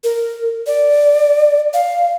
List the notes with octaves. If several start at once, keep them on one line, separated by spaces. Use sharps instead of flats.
A#4
D5
F5